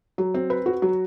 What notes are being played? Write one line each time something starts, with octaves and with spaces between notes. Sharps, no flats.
F#3
C4
B4
F#4
F#3